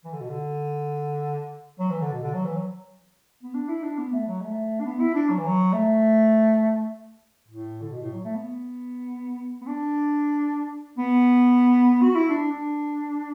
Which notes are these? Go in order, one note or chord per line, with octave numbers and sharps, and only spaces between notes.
E3
D3
B2
D3
F#3
E3
D3
B2
D3
F#3
E3
F#3
B3
D4
E4
D4
B3
A3
F#3
A3
D4
B3
E4
D4
F#3
E3
F#3
A3
A2
D3
B2
A2
F#3
A3
B3
B3
D4
B3
F#4
E4
D4
D4